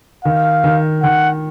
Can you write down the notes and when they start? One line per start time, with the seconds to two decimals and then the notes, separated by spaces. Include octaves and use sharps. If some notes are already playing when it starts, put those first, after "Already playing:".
0.24 D#3 F5
0.64 D#3
1.02 D#3 F#5